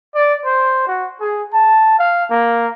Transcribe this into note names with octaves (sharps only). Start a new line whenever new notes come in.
D5
C5
F#4
G#4
A5
F5
A#3